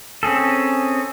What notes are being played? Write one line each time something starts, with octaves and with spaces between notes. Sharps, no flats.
C4 C#4 G#4 A4